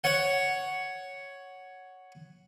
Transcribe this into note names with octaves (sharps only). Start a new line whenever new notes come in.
C#5 F#5